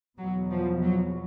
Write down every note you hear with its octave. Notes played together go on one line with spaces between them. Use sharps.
E2 B2 F#3
F3
F#3